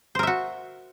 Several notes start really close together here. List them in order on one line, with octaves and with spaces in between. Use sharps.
C5 A#4 E5 F#4